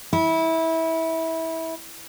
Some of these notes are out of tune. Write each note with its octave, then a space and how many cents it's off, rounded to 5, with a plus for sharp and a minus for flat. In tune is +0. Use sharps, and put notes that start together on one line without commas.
E4 -20